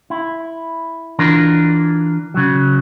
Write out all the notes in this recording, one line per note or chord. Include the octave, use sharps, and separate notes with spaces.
E4
E3 D4 F4 A#4
C#3 F#3